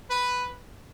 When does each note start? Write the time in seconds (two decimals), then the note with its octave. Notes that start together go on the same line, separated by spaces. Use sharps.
0.10 B4